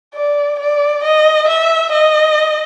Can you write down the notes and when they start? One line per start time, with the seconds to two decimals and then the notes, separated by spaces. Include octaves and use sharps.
0.15 D5
0.60 D5
1.04 D#5
1.49 E5
1.93 D#5